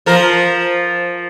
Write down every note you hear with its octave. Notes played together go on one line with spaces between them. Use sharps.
F3 A#4